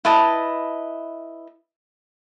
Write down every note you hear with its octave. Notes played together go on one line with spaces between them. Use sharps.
E4 B4 D#5 A5